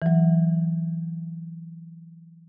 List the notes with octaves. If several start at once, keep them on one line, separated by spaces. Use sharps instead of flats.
E3 F#3